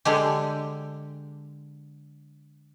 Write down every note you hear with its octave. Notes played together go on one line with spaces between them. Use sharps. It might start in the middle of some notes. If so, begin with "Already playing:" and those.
D3 G#3 G4